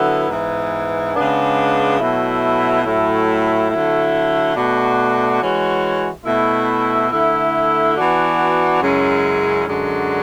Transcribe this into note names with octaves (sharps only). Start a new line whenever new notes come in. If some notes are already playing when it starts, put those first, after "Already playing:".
Already playing: D3 F#3 B3 E4
G#2 E3 B3
C#3 G#3 B3 D4
B2 F#3 A3 E4
A2 F#3 A3 E4
D3 F#3 A3 E4
B2 A3 D4 F#4
E3 G#3 C#4 F#4
B2 A3 E4
D3 A3 E4
E3 B3 D4 F#4
F#2 C#3 G#3 C#4 E4
F#2 D3 G#3 D4 F#4